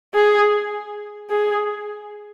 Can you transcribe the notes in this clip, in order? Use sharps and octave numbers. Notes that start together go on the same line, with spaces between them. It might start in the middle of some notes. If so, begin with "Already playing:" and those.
G#4
G#4